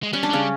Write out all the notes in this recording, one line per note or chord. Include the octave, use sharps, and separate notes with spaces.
G#3
G3 C#4
D4
C#3 G3 C#4